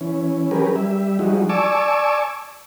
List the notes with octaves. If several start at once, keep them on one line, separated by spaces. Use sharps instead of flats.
E3 C#4
F#3 C#4 G4 G#4 A#4 B4
G3 E5
F3 G3 G#3 D#4 F#4
D5 G#5 A5 C#6 D6 E6